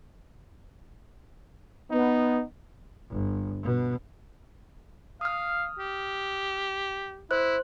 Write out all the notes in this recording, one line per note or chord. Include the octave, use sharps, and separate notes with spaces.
B3 D#4
G1
B2
F5 D#6 F6
G4
E4 C5 F#6